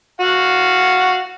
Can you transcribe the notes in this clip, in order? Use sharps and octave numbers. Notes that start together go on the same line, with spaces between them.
F#4 F5 F#5